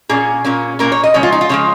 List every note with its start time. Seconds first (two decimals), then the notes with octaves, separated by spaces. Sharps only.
0.09 A#2 A#3 C#4 G#4
0.44 A#2 A#3 C#4
0.79 A#2 A#3 C#4 A#4
0.92 C#5
1.04 D#5
1.14 C#3 F3 G#3 C#5
1.23 F4
1.32 D#4
1.41 F4
1.49 C#3 F3 G#3 C#5